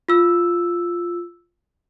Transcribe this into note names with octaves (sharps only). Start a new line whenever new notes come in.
F4 E6